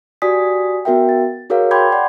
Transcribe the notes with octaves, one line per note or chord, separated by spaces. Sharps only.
F#4 G4 D5 G#5 D#6 B6
B3 F#4 A#4 E5 G5
A6
F#4 G#4 A#4 C#5 F5
G5 B5 C6 D6 G6 G#6
D5 F#5